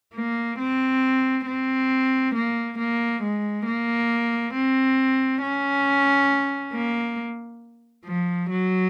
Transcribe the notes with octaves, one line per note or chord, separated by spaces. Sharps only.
A#3
C4
C4
A#3
A#3
G#3
A#3
C4
C#4
A#3
F3
F#3